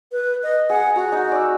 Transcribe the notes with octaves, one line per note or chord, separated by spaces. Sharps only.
B4
D#5
G#4 F#5
F#4 A#5
D#4
D5 E6